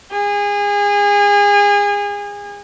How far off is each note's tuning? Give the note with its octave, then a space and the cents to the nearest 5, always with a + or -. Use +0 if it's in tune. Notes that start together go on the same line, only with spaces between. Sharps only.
G#4 -30